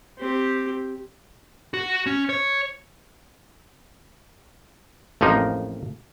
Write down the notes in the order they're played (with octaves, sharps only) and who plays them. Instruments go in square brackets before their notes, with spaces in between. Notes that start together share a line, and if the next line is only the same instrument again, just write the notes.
[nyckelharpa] C4 G4
[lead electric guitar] F#4
C#4
C#5
[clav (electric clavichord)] A1 F2 F3 A#3 D#4